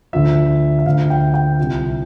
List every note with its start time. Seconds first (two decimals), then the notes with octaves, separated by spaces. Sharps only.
0.13 D2 D3 F3 E5
0.79 E5
0.86 D2 D3 F3 F5
1.10 G5
1.34 G5
1.59 C2 C3 F3